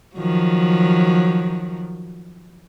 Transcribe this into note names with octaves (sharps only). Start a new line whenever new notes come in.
D#3 F3 F#3